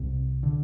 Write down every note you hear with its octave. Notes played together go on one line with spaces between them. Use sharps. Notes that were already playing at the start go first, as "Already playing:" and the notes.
Already playing: C2 C3
D3